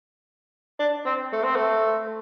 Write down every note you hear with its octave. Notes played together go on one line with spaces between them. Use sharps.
D4
C4
A3
C4
A3